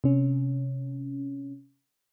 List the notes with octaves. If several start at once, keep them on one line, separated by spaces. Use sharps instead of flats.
C3 C#4